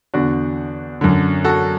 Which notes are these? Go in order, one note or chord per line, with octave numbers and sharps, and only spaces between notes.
E2 D3 D4 F#4
F#2 D3
F#4 A4